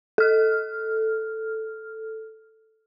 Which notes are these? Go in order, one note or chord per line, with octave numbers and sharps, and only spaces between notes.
A4 F6